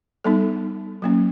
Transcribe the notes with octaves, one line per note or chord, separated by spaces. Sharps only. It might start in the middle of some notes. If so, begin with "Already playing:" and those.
G3 B3 D#4 A4
F#3 A#3 C#4